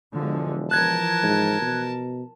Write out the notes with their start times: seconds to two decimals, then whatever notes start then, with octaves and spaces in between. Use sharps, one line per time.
0.16 E1 D3 F3 G#3
0.71 E3 F3 A#4 A5 F#6 G#6
1.23 G#2
1.61 B2